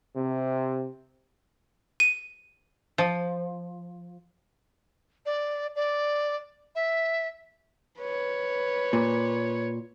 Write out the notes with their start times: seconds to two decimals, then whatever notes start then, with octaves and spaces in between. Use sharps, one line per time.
0.16 C3
2.00 D#7
2.98 F3
5.26 D5
5.76 D5
6.75 E5
7.99 B4 C#5
8.93 A#2